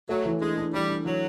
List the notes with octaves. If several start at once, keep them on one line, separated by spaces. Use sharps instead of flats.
F#3 A3
E3
G#3 D4
D4
E3 G3
D4
E3 F#3